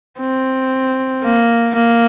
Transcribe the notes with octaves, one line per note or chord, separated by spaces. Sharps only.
C4
A#3
A#3